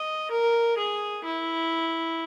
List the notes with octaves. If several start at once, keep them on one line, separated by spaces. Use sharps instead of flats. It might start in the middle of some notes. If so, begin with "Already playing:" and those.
Already playing: D#5
A#4
G#4
E4